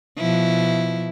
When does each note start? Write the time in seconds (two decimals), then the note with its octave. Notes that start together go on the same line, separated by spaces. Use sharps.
0.18 B2 F3 E4